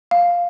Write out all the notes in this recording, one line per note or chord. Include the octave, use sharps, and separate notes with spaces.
F5